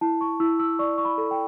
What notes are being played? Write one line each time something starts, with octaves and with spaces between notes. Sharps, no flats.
E4 A5
C#6
E4 E6
E6
D5 C#6
C#6
B5
A4
G5